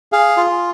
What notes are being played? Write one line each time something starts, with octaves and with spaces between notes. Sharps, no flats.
G#4 F5
F4